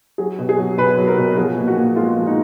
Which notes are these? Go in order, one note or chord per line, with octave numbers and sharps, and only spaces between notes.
F#3 G#4
B2
G#4
F#3
B2 B4
F#3
A#4
B2
F3 G#4
A#2
F#4
A#2
G#3 F4
F3
D#4